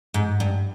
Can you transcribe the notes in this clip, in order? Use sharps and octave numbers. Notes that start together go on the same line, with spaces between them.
G#2
G2